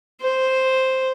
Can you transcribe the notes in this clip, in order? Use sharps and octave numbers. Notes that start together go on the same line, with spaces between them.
C5